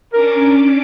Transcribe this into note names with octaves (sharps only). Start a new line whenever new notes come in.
C#4 D4 A#4 D6